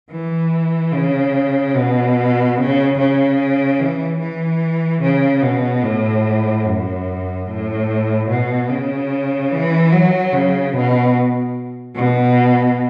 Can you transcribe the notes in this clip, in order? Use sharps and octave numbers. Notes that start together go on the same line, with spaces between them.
E3
C#3
B2
C#3
C#3
E3
E3
C#3
B2
A2
F#2
A2
B2
C#3
E3
F#3
C#3
B2
B2